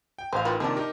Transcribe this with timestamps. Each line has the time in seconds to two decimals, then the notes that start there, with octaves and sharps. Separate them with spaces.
0.18 G5
0.33 A1 C5 F5
0.45 D#3 F4 B4
0.60 C3 D#3 F3 A#3 D4
0.76 D#4 G4 A#4